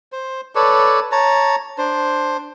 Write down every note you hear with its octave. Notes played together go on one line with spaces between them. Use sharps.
C5
A4 B4 C#5 D5
C#5 A5 A#5
D4 C5